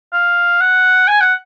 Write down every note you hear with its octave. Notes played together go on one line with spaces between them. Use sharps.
F5
F#5
G#5
F#5